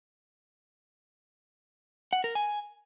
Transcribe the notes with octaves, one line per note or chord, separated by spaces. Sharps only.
F#5
A#4
G#5